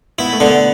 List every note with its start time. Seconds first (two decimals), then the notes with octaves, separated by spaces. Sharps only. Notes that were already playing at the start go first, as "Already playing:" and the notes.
0.19 B3 E4
0.33 A3
0.40 D3 B3